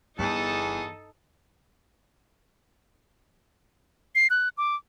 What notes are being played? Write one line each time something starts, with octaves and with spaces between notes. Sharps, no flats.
G1 E2 D#4 A4 A5 D#6
C7
F#6
D6